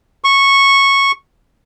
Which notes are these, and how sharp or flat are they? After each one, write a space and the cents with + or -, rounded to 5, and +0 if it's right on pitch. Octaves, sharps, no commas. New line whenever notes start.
C#6 -10